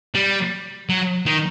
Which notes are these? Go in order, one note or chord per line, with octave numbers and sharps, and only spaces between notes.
G3
F#3
D#3